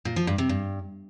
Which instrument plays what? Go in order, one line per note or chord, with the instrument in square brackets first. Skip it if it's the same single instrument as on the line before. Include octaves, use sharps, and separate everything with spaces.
[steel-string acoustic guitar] A#2
F3
G2
C3
G2